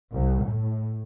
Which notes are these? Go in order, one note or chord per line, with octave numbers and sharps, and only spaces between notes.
C2
A2